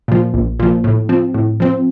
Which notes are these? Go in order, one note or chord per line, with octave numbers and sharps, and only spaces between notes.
A#2 F3
A#1
A#2 F3
A2
F3 C4
A2
F3 C4